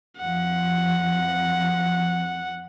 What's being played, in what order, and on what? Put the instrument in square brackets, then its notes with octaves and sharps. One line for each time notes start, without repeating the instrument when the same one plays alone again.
[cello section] F2 F3 [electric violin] F#5